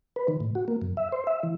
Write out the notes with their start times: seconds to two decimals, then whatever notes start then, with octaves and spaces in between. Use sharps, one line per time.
0.16 B4
0.28 D#3
0.40 A2
0.55 F#4
0.68 A#3
0.82 F#2
0.97 E5
1.12 C5
1.27 E5
1.43 E3